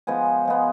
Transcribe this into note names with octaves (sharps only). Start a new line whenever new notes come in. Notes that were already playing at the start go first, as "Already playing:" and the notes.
F3 G#3 B3 G#5
F3 G#3 B3